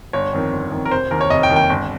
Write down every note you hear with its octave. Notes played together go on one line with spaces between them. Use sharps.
G1 C#5
F2 D#3
G1
F2 D#3
A#4
F1 C5
D#2 D#3 A#4
C#5
F1 D#5
G5
D#2 D#3
G5
G1